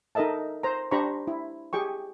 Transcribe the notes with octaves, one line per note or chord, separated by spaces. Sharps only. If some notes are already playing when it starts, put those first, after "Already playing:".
D#4 A4 A#4 D#5 E5 A5
C5 A#5
D4 G4 C5 A#5 B5 C#6
E4
G4 G#4 G5 C#6